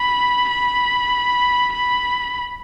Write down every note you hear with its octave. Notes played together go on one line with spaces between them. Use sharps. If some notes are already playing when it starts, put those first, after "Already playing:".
Already playing: B5
B5
B5